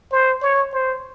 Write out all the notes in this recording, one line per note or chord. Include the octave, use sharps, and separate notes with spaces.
C5
C#5
C5